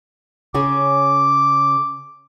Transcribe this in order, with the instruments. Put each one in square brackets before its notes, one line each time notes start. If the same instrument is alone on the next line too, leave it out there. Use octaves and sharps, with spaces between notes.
[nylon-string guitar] C#3 C#4 G#4 [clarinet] D6